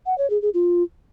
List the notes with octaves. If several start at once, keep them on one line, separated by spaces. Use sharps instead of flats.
F#5
C#5
G#4
G#4
F4